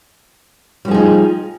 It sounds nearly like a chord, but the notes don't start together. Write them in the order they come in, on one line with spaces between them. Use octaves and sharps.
G3 F3 G#4 D#4